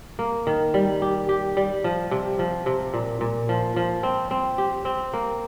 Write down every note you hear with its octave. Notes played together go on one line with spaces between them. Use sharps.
A#3
D#3
G3
G4
G4
G3
F3
C3
F3
C3
A#2
A#2
F3
F3
C4
C4
G4
C4
A#3